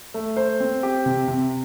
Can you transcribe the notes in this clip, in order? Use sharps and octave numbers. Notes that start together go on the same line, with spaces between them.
A3
C5
C4
G4
C3
C3